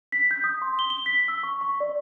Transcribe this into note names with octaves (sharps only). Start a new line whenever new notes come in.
B6
G6
D#6
C6
G7
G7
B6
E6
C#6
C#6
D5